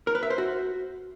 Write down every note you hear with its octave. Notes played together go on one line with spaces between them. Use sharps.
A#4
B4
E5
C5
F#4